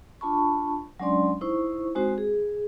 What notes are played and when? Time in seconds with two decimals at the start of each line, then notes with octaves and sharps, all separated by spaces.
0.21 D4 F4 A5 B5 C#6
0.99 F#3 G#3 C#4 D4 D5 C6
1.41 D#4 E4 C5 C#6
1.95 G#3 C4 D#4 F#4 C5
2.18 G#4